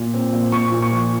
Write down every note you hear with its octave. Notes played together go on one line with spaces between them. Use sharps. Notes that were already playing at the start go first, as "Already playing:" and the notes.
Already playing: A#2
C4
A#2
A#2 C#6
A#2
C#6
F3